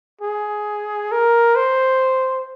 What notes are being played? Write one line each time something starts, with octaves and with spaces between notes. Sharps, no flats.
G#4
A#4
C5